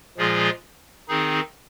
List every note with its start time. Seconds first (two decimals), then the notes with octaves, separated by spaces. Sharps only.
0.18 A#2 F3 G#3 F4 G#4
1.08 D#3 C4 D#4 G#4